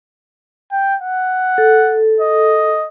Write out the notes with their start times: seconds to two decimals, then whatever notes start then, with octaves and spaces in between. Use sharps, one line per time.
0.72 G5
1.02 F#5
1.58 A4
2.20 D#5